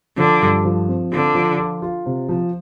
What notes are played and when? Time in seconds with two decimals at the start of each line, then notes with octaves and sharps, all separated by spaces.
0.17 D3 F3
0.42 G2
0.64 F3
0.88 C4
1.11 D3 F4
1.35 F3
1.58 F4
1.82 F4
2.06 C3
2.29 F3